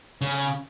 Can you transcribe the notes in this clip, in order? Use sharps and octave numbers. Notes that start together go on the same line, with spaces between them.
C#3